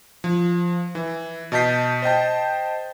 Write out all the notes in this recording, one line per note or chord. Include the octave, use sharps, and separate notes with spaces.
F3
E3
B2 D#5 A5 G6 B6 C7
C5 D#5 G5 A5